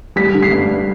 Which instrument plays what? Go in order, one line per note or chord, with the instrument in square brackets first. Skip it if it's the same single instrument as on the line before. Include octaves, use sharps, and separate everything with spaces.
[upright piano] G3 B6
D3
C7
G2